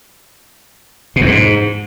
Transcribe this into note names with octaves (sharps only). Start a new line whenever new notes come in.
B2
E2
G#2